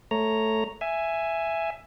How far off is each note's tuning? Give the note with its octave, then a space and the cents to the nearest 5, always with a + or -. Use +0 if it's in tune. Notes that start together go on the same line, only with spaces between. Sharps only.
A3 +0 C#5 +0 A#5 +0
E5 +10 G#5 +0